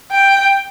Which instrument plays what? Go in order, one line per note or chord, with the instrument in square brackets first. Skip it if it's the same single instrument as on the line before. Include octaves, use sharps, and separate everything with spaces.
[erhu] G5